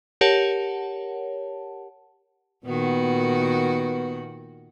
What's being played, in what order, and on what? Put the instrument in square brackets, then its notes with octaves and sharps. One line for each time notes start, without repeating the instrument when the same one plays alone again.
[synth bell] G4 A#4 C#5 F#5 A5
[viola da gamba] A#2 D#3 F#4 [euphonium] B3